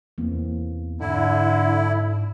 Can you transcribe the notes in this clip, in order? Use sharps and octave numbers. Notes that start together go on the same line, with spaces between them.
E2 E3 A#3 C4
G#2 D3 E4